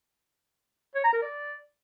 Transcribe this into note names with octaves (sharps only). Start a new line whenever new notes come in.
C#5
A#5
A#4
D5